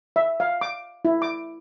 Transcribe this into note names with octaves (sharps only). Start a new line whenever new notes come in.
E5
F5
D6
E4
D6